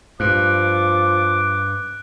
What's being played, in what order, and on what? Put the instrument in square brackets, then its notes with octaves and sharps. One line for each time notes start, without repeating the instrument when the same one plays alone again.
[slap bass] G2 [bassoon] F3 [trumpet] D6 [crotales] F#6 D7